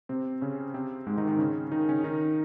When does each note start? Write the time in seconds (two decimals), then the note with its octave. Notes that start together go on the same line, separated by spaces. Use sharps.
0.09 C3 C4
0.41 C#3 C#4
0.74 C3 C4
1.07 G#2 G#3
1.18 D#3 D#4
1.28 D#3 D#4
1.39 C#3 C#4
1.72 D#3 D#4
1.89 C#3 C#4
2.04 D#3 D#4